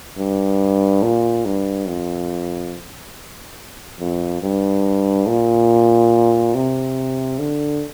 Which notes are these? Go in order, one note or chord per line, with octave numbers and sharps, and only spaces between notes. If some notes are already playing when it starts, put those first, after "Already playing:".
G2
A#2
G2
F2
F2
G2
A#2
C3
D3